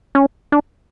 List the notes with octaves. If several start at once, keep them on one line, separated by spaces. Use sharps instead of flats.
C#4
D4